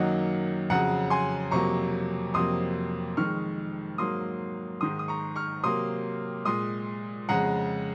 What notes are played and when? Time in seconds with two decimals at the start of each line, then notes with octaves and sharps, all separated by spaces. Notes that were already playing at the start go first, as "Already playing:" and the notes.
Already playing: F#2 D#3 F#3 A#3 D#5 F#5
0.70 F2 C#3 F#3 F#5 A#5
1.10 G#5 C6
1.51 F2 C3 F#3 A#3 A#5 C#6
2.34 F2 C3 F#3 A#3 C6 D#6
3.17 F2 D#3 G#3 C#6 F6
3.98 G#2 F#3 A#3 C6 D#6
4.81 G#2 D#3 G#3 C6 D#6
4.99 D#6
5.08 A#5 C#6
5.36 C#6 F6
5.64 C3 F#3 A#3 C6 D#6
6.45 A#2 G#3 C6 D#6
7.29 F2 C#3 G#3 F#5 A#5